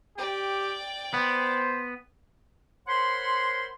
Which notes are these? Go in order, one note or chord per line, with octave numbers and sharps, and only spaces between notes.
G4 D5 G5
B3 C5
A#4 C5 C#5 F#5 B5 C6